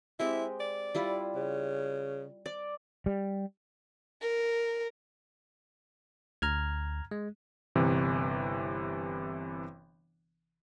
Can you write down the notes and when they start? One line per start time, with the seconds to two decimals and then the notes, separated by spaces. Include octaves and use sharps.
0.19 G#3 C4 E4 G4
0.60 D5
0.95 G3 E4 F4
1.35 C#3
2.46 D5
3.06 G3
4.21 A#4
6.42 D2 A#5 F6 G#6
7.11 G#3
7.76 G1 C3 E3